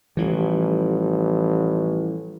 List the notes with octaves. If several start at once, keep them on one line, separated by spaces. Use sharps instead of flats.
A1 E3 F3 G3